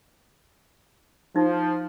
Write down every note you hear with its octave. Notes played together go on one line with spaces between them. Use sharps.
F3 D#4